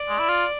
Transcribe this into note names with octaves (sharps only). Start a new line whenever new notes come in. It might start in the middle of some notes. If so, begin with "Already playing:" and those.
Already playing: D5
G#3
E4
F4